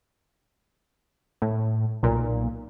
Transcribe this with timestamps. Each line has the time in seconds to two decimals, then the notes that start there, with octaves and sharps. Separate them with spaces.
1.42 A2
2.03 B1 A#2